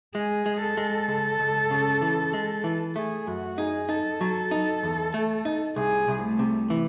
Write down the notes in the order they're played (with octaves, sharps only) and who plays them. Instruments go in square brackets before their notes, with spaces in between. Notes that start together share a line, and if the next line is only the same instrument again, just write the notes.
[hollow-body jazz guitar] G#3 [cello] G#4
[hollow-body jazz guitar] G#3
[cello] A4
[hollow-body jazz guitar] G#3
C#2
C#2
C#3
E3
G#3
E3
[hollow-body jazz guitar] A3 [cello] G#4
[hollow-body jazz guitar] F#2 [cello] F#4
[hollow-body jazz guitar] D#4 [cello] G#4
[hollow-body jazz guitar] D#4 [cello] A4
[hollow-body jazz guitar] F#3
D#4
E2
A3
D#4
[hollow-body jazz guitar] C2 [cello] G#4
[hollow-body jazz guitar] C2
[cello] A3
[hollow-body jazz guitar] C3
E3